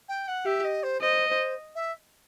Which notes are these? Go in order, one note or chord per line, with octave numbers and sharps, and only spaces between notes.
G5
F#5
G4 E5
D#5
C5
C5 D#5
C5
E5